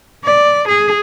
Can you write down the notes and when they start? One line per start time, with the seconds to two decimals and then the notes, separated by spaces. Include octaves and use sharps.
0.24 D5
0.68 G#4